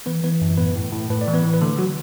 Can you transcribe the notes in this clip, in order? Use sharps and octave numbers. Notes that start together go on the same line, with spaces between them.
E3 B3 B4
E3 B3 B4
F#2
A2 B3 B4
A2
A2
A2 B4
D5
E3
B3 B4
E3
B4
D3 A3 A4
F#3 F#4